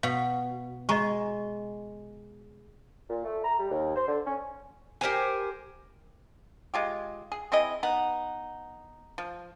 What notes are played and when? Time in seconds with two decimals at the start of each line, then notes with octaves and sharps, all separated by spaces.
0.03 B2 F5
0.89 G#3 D#5 A#5 C#6
3.10 A#2
3.25 A3
3.44 A#5
3.59 G3
3.71 D#2
3.96 C5
4.08 D3
4.27 C#4
5.01 G4 A#4 C5 G#5
6.74 G#3 F4 G4
7.32 G#4
7.52 C4 E4 G#4 D#5
7.83 B3 D#4 F#5
9.18 F3